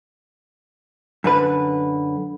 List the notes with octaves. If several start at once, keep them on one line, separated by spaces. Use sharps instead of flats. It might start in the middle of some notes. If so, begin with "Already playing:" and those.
F#2 D3 B4